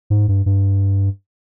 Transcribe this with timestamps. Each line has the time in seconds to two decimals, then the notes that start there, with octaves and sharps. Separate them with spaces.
0.10 G#2
0.28 G2
0.46 G2